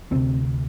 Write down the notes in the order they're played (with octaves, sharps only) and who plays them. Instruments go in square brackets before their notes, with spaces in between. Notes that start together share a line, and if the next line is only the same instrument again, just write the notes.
[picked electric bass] D2 C3 C4